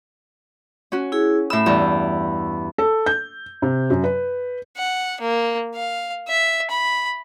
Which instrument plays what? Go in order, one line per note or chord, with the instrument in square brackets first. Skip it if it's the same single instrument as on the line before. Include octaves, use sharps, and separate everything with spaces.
[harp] C#4 F#4
[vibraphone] E4 G#4
[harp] A2 E6 [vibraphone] B5
[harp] E2 G2
[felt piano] A4
G6
C3
F#2
B4
[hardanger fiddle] F#5
A#3
F5
E5
B5